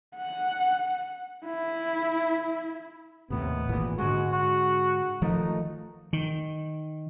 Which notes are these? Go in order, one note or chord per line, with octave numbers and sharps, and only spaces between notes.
F#5
E4
D#2 A2 C3 B3
G#1 A#2 E3
G#2 D3 G#3 F#4
F#4
D#3 F3 A3 D#4
D#3